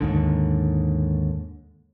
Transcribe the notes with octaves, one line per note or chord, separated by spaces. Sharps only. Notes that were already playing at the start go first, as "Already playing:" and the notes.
D#2 G#2 D3